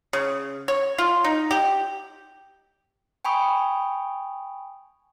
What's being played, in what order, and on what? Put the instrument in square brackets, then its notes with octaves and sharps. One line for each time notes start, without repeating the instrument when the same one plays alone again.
[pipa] C#3
C#5
F4
D#4
G4
[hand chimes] G5 G#5 B5 C#6 D#6